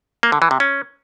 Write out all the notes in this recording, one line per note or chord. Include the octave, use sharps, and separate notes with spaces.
A#3
D3
E3
C3
C#4